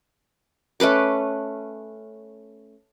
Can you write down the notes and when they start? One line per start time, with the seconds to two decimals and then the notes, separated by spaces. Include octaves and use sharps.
0.80 A3 C#4 B4 D6